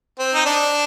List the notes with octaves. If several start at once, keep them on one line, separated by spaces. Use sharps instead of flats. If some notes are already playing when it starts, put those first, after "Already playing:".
C4
D#4
D4